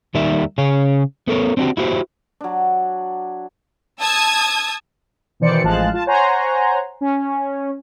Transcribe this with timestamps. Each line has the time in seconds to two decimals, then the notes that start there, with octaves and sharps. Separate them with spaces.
0.14 D#2 D#3 G3 A#4 E5
0.58 C#3 G#4 C#5
1.28 B3 A4 A#4 C#5
1.57 C4 D4 D#4 F#4 G4
1.77 E4 F#4 G4 C5
2.41 F#3 D4
4.00 A5 D#6 E6 G#6
5.40 B2 D#3 E3 C5 D5 C#7
5.63 A1 F3 G#3 F5 A5 F#6
5.93 F4 A5
6.06 C5 C#5 F#5 G#5 A#5 C6
7.01 C#4